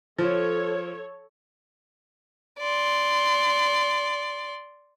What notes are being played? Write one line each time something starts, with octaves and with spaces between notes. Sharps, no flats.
F3 A4 C#5
D5 C6